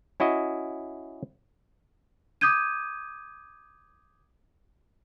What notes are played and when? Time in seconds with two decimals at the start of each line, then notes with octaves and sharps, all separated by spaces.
0.20 C#4 E4 F#4 D#5
2.41 D6 D#6 G6 G#6 D#7